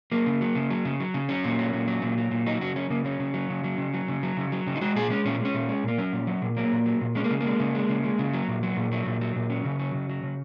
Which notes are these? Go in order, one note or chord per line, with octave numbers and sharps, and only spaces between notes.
F#3 A#3
C#3
F#3
C#3
F#3
C#3
F#3
C#3
F#3 C#4
A#2
F#3
A#2
F#3
A#2
F#3
A#2
F#3 D#4
C#3 F#4
F#3 C#4
C#3 A#3
F#3 C#4
C#3
F#3
C#3
F#3
C#3
F#3
C#3
F#3
C#3
F#3
C#3
D#4
G#3 F#4
A#2 G#4
G#3 C#4
A#2 C#4
A#3
G#3
C#4
A#2
G#3
A#2 A#3
F#3 C#4
A#2
F#3
A#2
F#3 A#3
A#2
F#3
A#2
G#3 C#4
A#3
C#3
G#3 A#3
C#3
G#3
C#3
G#3
C#3
F#3
A#2
F#3
A#2
F#3
A#2
F#3
A#2
F#3 C#4
C#3
F#3
C#3
F#3
C#3